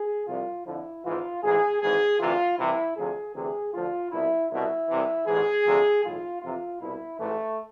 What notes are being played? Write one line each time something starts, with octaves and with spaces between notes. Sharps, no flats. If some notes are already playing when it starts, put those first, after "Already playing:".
Already playing: G#4
C2 C3 F3 F4
F2 D3 F3 E4
G#1 G#2 E3 F4
A1 G#2 E3 G#4
G#1 G#2 E3 G#4
D2 C3 E3 F4
C2 C3 E3 E4
D2 C3 F3 G#4
D2 C3 E3 G#4
D2 D3 F3 F4
C2 B2 E4
C2 B2 E4
C2 C3 E3
A1 G#2 E3 G#4
D2 C3 F3
B1 A2 E3 F4
F2 C3 E3 F4
C2 B2 E4
A1 G#2 E3 A3